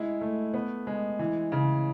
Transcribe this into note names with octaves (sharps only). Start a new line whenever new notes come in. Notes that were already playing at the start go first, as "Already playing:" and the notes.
Already playing: G#3 E4
A3
B3
G#3
E3
C#3